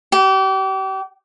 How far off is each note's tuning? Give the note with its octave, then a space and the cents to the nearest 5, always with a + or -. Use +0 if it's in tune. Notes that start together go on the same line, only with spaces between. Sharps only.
G4 -35